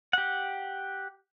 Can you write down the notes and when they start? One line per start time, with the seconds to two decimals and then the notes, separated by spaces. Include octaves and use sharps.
0.13 G4 F#5